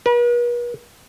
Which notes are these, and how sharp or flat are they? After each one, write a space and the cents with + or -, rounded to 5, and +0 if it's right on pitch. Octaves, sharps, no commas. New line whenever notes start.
B4 -45